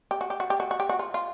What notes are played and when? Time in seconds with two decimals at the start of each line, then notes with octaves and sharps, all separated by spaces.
0.11 G4
0.21 F#4
0.30 G4
0.40 F#4
0.50 G4
0.60 F#4
0.71 F#4
0.80 G4
0.89 F#4
0.99 F4
1.14 F4